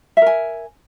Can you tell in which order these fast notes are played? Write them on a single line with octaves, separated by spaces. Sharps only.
E5 A#4 G#5